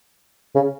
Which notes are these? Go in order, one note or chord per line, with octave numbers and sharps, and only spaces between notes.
C#3